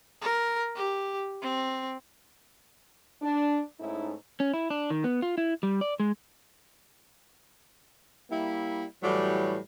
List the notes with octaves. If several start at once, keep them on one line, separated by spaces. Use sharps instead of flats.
A#4
G4
C4
D4
G#2 A3 C#4 D#4 E4
C#4
E4
D4
D#3
B3
F4
E4
G3
D5
G#3
G3 A#3 E4
A2 E3 F#3 G3